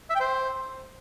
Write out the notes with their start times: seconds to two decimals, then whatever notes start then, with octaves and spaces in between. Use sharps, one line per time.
0.10 E5
0.15 G5
0.20 C5